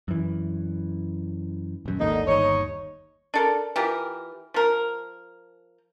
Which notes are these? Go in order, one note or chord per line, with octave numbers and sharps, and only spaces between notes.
F#2 E3
D#1 F#2
G#1 D#2 D3 A#3 D#4
G1 D#2 D#4 C#5
D4 A4 A#4
E3 F4 G4 A#4
F3 A#4